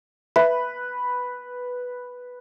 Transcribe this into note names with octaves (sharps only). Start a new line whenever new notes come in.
B4 E5